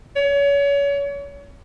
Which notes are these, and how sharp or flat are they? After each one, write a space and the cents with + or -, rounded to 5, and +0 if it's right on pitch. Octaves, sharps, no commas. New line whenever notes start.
C#5 +30